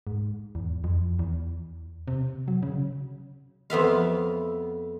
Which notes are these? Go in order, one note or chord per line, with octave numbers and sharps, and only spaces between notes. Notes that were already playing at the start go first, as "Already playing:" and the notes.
G#2
E2
F2
E2
C3
F#3
C#3
F2 B3 E5 F5